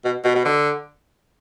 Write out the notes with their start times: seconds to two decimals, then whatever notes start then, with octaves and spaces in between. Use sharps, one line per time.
0.04 B2
0.24 B2
0.35 B2
0.45 D3